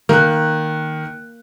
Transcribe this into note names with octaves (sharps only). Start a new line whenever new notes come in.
D#3 A#3 F#6